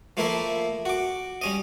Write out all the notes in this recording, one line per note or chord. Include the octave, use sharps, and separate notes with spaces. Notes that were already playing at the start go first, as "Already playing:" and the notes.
F3 A3 A#3 E4 A#4 E5
F#4 D6
G3 C#4 D#5